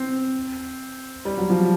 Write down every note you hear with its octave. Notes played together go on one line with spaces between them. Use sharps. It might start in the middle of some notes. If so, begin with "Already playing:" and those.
Already playing: C4
G3
F#3
F3